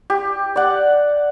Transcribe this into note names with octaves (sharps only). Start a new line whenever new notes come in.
G4
D5 F#5